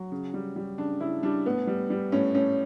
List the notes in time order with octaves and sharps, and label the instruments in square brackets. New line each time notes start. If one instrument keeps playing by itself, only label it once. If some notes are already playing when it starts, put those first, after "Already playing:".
Already playing: [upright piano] F#3
C#3
G3
G3
C#3 D4
C#3 E4
G3 D4
A2 B3
G3
G3
A2 C#4
A2 C#4